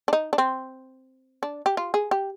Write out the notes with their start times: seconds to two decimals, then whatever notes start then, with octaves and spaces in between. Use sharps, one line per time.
0.08 D4
0.13 D#4
0.33 D4
0.38 C4
1.43 D4
1.66 G4
1.77 F4
1.94 G#4
2.11 G4